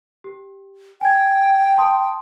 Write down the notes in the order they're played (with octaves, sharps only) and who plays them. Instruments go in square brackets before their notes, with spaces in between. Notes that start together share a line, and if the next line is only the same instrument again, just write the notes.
[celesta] G4
[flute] G5 [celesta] G#5 G#6
[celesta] A5 C6 D#6